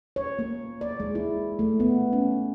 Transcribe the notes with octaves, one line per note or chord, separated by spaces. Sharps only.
C#5
A#3
D5
G#3
E4
A3
B3
C#4